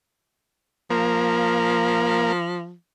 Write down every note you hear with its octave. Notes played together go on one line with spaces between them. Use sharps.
F3 A#3